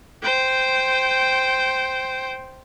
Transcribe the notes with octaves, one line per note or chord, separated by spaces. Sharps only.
C5 G5